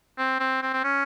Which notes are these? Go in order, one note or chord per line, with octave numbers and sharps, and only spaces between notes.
C4
C4
C4
C4
C#4